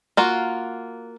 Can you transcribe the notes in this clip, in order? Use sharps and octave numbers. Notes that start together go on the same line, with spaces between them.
A#3 F4 F#4